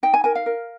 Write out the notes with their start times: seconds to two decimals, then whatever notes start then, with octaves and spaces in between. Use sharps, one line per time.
0.03 D#4 G5
0.14 G#5
0.24 A#4 G#5
0.35 F5
0.46 A#4